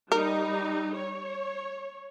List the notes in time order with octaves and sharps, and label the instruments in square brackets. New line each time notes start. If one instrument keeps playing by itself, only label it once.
[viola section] G3 D#4 [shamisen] A#4
[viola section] C#5